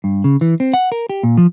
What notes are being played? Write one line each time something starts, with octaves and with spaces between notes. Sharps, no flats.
G2
C#3
E3
C4
F#5
A#4
G4
A#2
F3